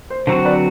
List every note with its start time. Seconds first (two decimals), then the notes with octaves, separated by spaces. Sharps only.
0.10 C5
0.27 D3 F#3 C4 F#4 C5
0.45 B4 D5